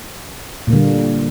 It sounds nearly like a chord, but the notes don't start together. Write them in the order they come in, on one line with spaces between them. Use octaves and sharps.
A#2 A#3 D3 G3